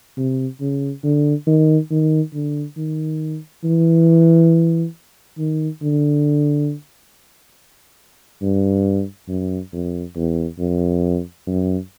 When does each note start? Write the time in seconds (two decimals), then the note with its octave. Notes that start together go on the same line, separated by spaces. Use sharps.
0.17 C3
0.60 C#3
1.04 D3
1.47 D#3
1.91 D#3
2.34 D3
2.77 D#3
3.64 E3
5.38 D#3
5.82 D3
8.42 G2
9.28 F#2
9.73 F2
10.16 E2
10.59 F2
11.47 F#2